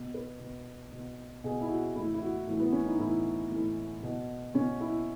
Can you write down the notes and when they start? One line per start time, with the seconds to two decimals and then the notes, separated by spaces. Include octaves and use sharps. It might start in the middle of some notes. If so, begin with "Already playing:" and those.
Already playing: B2
0.14 B4
0.39 B2
0.92 B2
1.44 B2 G#4
1.61 E4
1.69 F#4
1.95 A2 E4
1.99 E3
2.14 E4
2.22 F#4
2.47 A2 E3
2.60 B3
2.72 C#4
2.86 D#4
2.99 A2 E3 E4
3.52 A2 E3
4.03 B2
4.54 B2 C#4
4.80 E4